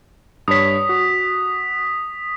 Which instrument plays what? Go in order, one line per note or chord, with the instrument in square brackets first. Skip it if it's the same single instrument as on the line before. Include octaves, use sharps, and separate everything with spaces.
[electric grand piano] G2 C#5 [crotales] D#6 B6
[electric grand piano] F#4